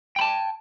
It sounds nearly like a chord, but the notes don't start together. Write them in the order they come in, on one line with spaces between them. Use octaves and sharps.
G5 B5 A5